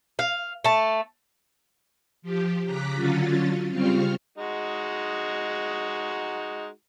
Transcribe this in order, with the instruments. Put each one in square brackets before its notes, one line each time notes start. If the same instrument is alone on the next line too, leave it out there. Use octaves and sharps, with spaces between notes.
[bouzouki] F5
A3 A5
[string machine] F3 G4
C#3 A#5 D6 F#6 B6
D3 F#3 C#4 F4 A6
C#3 G3 C4 F4 C#6 F6
[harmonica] G#3 D#4 F#4